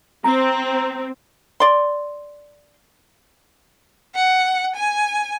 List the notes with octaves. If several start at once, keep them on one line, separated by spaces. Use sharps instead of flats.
C4 A#5
D5 C6
F#5
G#5